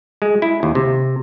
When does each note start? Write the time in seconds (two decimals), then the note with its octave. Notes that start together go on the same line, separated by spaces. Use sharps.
0.22 G#3
0.42 E4
0.63 D#2
0.75 C3